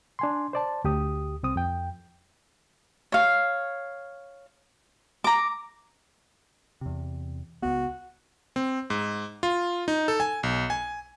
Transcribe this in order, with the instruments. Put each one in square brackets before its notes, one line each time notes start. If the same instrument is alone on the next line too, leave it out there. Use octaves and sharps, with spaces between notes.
[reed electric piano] D4 G#5 C6
C5 D5 A5
D2 G4 D#6
C2 C4 D#6
F2 G5
[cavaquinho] C#5 F5
A#5 D6
[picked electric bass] E2 C3
[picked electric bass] C#2 B3 [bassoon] F#4
[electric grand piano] C4
G#2
F4
D#4
A4
G#5
B1
G#5